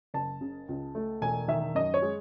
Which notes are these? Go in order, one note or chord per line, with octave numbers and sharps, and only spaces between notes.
F#1 A5
C#3
C#2
A3
E1 G#5
D#3 E5
F#2 D#5
C#5
G#3